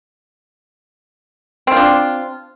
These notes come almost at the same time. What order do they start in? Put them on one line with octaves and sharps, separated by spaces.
C4 F4 D4